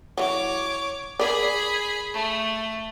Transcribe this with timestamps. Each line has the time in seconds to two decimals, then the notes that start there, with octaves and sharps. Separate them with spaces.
0.18 E3 F#3 C#5 D6
1.19 G#4 A#4 D5 B5
2.13 A3